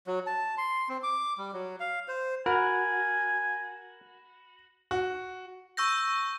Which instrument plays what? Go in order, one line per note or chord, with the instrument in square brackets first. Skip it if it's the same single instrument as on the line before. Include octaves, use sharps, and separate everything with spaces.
[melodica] F#3
A5
C6
C4
D6
G3
F#3
F5
C5
[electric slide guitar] F#4 [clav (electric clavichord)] A#4 [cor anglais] G#5 [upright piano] B5 F6
[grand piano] F#4
[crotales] C#6 E6 G6 A#6